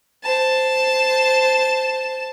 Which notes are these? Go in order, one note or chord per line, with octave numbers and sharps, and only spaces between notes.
C5 A5